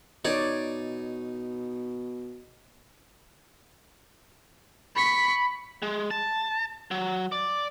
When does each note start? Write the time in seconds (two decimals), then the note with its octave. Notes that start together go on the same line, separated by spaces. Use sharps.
0.25 B2 D#4 C#5 D5
4.95 B5 C#6 B6
5.82 G#3
6.11 A5
6.91 F#3
7.32 D5